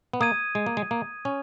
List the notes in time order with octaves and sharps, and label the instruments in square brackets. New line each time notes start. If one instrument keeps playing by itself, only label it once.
[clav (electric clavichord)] B3
[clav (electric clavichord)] A#3 [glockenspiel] D#6 G#6 D#7
[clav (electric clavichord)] G#3
A#3
G#3
A#3
C#4